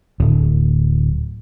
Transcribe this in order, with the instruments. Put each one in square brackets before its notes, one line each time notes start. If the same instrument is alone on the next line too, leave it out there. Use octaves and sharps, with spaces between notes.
[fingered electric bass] D1